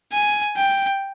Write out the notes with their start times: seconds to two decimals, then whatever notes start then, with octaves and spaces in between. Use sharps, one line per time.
0.13 G#5
0.57 G5